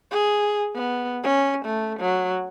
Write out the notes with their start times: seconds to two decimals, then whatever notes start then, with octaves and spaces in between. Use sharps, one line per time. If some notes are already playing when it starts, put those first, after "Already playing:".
0.11 G#4
0.75 B3
1.23 C#4
1.65 A3
2.00 F#3